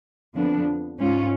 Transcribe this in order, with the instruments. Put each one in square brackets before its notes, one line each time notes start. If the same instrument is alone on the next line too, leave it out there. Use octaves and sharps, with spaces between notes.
[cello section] F2 D3 F3 B3 D4
G#2 G#3 C#4 F4